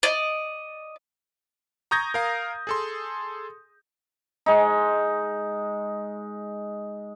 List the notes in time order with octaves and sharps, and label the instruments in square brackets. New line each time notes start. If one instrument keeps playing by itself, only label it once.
[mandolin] D5 D#5
[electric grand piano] A#5 C#6 D#6 G6 G#6 A#6
A#4 F5 A#5
G#4 A4 C6
[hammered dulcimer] G#3 D#4